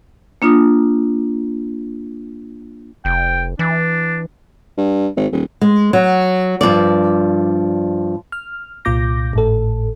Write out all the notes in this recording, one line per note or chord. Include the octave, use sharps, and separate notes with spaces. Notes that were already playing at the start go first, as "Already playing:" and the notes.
A#3 D4 F4 D#6
F1 G5
E3 D4
G2
G#1
D#1
G#3
F#3
G2 B2 F3 D5
F6
C2 A#2 F4 D6 G6 A#6
G#1 A2 A4